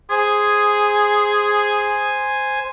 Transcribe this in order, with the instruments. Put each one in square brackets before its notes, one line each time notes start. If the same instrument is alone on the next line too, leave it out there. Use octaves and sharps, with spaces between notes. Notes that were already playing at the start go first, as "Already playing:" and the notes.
[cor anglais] G#4 [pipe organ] C5 G#5